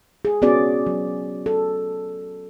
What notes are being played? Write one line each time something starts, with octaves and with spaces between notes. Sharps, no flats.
G#4
B3 C#4 F#4 G#4 D5
F#3
A4